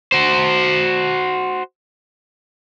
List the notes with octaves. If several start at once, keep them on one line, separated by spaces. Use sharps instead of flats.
F#4 C5